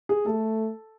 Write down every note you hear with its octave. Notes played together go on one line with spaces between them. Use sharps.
G#4
A3 A4